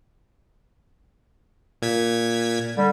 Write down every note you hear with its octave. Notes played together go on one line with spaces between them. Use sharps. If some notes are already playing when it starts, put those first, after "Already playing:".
A#2 G#6 B6
D3 G3